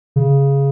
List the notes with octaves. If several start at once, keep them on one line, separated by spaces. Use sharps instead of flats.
C#3